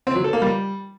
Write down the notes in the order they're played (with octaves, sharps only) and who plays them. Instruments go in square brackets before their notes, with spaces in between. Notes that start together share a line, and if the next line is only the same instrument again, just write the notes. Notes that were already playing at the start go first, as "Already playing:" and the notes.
[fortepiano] C4
F#3
A4
A#3
G3